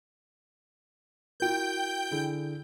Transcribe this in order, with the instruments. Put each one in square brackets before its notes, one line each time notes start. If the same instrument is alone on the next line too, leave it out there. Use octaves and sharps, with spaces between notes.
[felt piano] E4 F#4 A#4 [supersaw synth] G5 G6
[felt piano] D3 E4 G#4